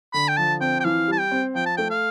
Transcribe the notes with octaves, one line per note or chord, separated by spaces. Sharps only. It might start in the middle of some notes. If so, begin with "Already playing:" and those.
D3 B5
G5
F3 A5
C4 G5
G5
E3 F5
G3 A5
G5
C4
F3 G5
A5
A3 G5
F5